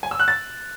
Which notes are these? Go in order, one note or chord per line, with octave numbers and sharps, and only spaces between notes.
G#5
E6
F#6
A6